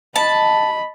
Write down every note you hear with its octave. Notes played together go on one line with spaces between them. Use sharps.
D#5 A5 B5